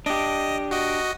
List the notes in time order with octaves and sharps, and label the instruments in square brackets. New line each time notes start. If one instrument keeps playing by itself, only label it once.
[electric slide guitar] D4 G4 [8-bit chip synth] D#5
[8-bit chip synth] F#4 D#5